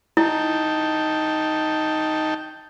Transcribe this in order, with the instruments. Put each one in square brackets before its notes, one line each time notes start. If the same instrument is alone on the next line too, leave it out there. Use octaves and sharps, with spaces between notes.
[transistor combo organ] D#4 G5 A5 [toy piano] E4